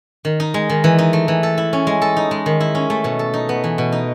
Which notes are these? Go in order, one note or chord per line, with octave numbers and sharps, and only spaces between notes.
D#3
D#4
G#3
D#3
E3
D#4
A3
E3
A4
E4
C#4
G#3
A4
D#4
G#3
D#3
E4
C#4
A3
B2
A4
D#4
B3
E3
B2
D#4